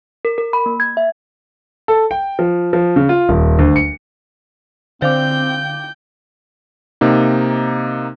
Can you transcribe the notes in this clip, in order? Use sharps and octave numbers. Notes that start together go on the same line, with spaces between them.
A#4
A#4
B5
A#3
G#6
E5
A4
G5
F3
F3
C#3
F4
D#1
D2
C#7
D3 C4 C5 F5 G5 D6 G6
C3 A#3 D#4